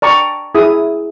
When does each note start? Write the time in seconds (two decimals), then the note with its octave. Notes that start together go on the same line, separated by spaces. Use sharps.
0.02 D5 G5 A5 A#5 C#6 D6
0.55 E4 G#4 D#6